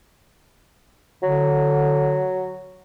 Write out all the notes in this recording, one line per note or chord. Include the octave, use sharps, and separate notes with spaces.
D3 F#3